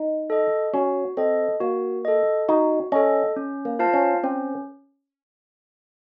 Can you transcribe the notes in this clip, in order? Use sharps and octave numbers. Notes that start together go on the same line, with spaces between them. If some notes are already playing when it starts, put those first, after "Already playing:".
Already playing: D#4
A4 D#5
C#4 F#4
C4 A4 D#5
A#3 F#4
A4 D#5
D#4 F#4
C#4 A4 D#5
C#4
A#3
F4 C5 F5 A5
C#4
C4 C#4